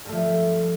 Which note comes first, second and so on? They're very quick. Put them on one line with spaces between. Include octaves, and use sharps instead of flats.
G2 A3 F3